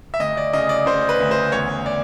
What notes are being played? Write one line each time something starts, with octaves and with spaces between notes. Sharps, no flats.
E5
D2 D#5
D5
C#3 D#5
D5
C#3 C5
B4
D2
C5
E2 C#5
D5